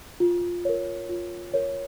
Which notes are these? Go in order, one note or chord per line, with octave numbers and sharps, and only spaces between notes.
F4
A#4 C#5
F4
A#4 C#5